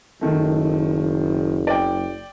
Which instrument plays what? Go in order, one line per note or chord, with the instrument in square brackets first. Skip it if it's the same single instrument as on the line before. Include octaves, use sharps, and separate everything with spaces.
[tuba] F#1 [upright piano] D#3 A3
[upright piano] D5 G5